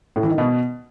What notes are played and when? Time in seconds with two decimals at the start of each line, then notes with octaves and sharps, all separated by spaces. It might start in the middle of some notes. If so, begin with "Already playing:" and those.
0.16 A2
0.23 E3
0.31 D#3
0.38 B2